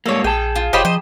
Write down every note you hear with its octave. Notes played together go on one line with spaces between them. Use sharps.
G#2 G3 A#3 A4 C#5
A#1 G#4 G5 A5
F4
F1 F4 G4 C5 C#5 D#5 B5
F3 C5 D#5